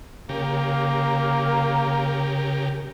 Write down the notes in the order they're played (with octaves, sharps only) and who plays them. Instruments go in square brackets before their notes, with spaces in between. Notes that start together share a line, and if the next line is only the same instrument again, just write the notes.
[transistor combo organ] C#3 G4 A#4 [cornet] A#3